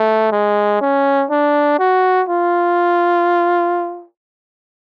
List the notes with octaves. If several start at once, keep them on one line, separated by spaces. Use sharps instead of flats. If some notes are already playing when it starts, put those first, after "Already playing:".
Already playing: A3
G#3
C#4
D4
F#4
F4